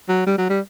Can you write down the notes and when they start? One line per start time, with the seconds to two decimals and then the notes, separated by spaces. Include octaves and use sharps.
0.09 F#3
0.27 G3
0.38 F#3
0.50 G3